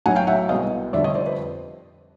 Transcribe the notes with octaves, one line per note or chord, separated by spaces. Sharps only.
B1 A2 F#3 F#5 G#5
F5 G5
E5 F#5
C2 B2 G#3 D#5 F5
F1 F2 D3 G3 D5 E5
C#5 D#5
C5 D5
B4